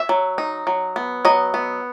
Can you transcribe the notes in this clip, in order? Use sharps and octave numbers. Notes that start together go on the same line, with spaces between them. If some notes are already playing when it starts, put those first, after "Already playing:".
Already playing: E5
F#3
D#4
F#3
B3
F#3 D#5
B3